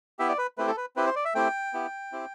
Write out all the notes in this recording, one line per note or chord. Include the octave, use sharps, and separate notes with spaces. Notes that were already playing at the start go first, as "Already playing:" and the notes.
B3 E4 G4 E5
D5
B4
A3 C4 E4 G4 B4
A4
B4
C4 E4 G4 B4
C5
D5
E5
A3 C4 E4 G4 G5
B3 E4 G4
C4 E4 G4